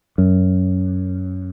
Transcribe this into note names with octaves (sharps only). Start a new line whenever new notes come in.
F#2